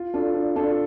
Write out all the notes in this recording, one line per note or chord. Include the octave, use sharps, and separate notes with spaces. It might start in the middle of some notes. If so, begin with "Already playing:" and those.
Already playing: F4
D4 F4 A4
D4 F4
D4 F4 A4